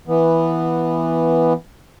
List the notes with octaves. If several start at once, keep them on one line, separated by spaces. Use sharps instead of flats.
E3 B3